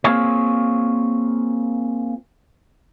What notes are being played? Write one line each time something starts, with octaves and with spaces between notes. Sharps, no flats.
A#3 C4 F4 G#4 C#5